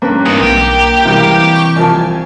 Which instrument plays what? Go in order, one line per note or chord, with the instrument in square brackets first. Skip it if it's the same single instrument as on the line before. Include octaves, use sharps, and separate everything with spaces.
[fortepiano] G2 B4 [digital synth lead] A#3 [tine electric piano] C4 C#4
[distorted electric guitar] E2 G#2 [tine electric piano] D#6
[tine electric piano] B1 [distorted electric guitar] G4
[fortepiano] C3 G3 A#3 [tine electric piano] E3 C4
[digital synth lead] C#6
[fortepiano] C2 F3 A5 [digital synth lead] G#5